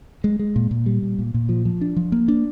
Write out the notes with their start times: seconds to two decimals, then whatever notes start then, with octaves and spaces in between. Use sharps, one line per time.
0.24 G#3
0.39 G#3
0.56 A#2
0.71 A#2
0.86 G3
1.02 A#2
1.19 A#2
1.34 A#2
1.49 F3
1.65 F3
1.81 D4
1.96 F3
2.12 A#3
2.28 D4